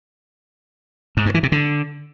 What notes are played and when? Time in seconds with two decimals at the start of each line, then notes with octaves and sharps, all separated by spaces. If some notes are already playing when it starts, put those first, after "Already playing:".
1.17 G#2
1.26 G2
1.34 E3
1.43 C3
1.52 D3